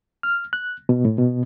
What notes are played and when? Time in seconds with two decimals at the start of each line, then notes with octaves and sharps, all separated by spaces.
0.23 F6
0.53 F#6
0.89 B2
1.05 A2
1.18 B2